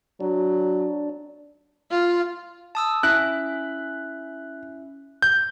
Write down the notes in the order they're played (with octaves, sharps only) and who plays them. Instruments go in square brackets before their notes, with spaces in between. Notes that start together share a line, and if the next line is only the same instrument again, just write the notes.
[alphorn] F#3 [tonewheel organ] D4
[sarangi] F4
[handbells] A5 D#6 E6
[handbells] C#4 E4 E5 [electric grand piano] F#6
[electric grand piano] G6